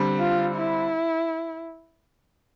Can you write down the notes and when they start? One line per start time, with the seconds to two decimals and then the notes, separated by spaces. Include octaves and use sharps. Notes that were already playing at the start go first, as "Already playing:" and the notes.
Already playing: D3 G3 C4
0.19 F4
0.55 E4